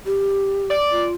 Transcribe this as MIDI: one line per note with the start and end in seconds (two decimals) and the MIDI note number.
0.06 0.72 67
0.70 1.05 74
0.91 1.14 65